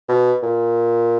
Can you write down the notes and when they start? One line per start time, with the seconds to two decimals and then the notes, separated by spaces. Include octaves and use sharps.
0.09 B2
0.43 A#2